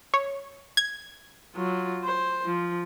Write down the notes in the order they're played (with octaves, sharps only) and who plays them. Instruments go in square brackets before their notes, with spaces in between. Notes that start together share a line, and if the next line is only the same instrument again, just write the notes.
[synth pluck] C#5
G#6
[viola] F#3 F4
C5
F3